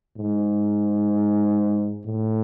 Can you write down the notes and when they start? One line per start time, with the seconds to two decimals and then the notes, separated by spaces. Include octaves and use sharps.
0.17 G#2
2.06 A2